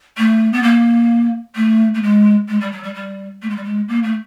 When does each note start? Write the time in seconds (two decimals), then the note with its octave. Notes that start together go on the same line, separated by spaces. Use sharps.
0.18 A3
0.53 B3
0.63 A#3
1.56 A3
1.94 A3
2.02 G#3
2.48 G#3
2.61 G3
2.72 F#3
2.83 G3
2.95 G3
3.42 A3
3.50 G#3
3.56 G3
3.64 G#3
3.88 A#3
4.03 A3